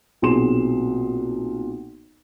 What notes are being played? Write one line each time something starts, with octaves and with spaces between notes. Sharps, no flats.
B1 A#2 C4 G#4 C6 E7